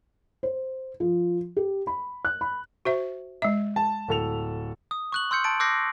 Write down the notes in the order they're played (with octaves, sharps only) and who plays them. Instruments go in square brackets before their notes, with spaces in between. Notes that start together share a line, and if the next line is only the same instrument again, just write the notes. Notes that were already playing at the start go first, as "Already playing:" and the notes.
[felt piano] C5
F3
G4
B5
F#6
B5
[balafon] F#4 C5 E5
G#3 E5
[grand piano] A5
D1 A4 F7
[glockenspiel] D#6
C#6 F#6 F#7
C6 E6 G6 C#7
A5 A6 D7
D6 E6 F#6 G6 A#6 C7